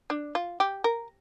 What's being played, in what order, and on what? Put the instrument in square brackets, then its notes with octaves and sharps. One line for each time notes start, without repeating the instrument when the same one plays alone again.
[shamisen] D4
F4
G4
A#4